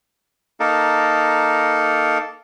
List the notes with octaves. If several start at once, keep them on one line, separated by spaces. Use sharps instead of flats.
A#3 D#4 A4